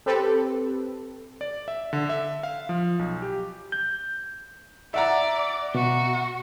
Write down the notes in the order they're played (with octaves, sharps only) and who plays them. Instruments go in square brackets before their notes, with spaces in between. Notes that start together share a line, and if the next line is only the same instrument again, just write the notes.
[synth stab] C4 G4 A4 B4
[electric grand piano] D5
E5
D3
E5
F5
F3
B1
G4
[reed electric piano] G6
[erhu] D5 [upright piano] E5 F#5 A#5
[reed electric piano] B2 [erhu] F#4